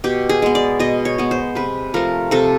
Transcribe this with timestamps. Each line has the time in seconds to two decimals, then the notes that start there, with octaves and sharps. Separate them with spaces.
0.04 B2 G4
0.29 G#4
0.42 G#3 B3
0.55 D5
0.80 B2 D#5
1.05 C#5
1.18 G#3 B3
1.31 C5
1.55 C3 B4
1.94 F3 A3 A#4
2.31 C3 A4